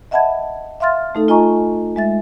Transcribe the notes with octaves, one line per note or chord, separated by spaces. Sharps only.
D#5 E5 F#5 A5 B5 G#6
E5 F5 C6 F6 A6
A3 D#4 A4
F4 D#5 G#5 A#5 C#6
G#3 E5 A6